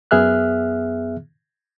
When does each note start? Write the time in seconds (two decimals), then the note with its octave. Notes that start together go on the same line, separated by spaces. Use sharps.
0.11 F#2 B3 G#4 E5 F6 F#6